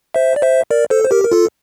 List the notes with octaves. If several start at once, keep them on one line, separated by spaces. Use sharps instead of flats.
C5 E5
D5
C5 E5
A#4 D5
A4 C5
C5
G4 A#4
A#4
F4 A4